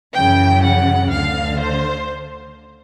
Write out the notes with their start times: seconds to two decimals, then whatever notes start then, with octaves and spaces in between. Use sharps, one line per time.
0.14 F#2 C#3 E3 G5
0.63 F#5
1.11 D2 D3 F5
1.59 C5